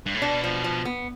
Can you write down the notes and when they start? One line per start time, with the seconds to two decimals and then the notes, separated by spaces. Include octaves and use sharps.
0.06 G2
0.15 A2
0.22 B2 D4
0.44 F3
0.64 F3
0.85 B3